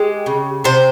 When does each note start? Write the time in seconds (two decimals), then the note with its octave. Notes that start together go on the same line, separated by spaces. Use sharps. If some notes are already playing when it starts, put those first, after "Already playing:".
Already playing: G#3 G4
0.26 C#3
0.64 C3 C5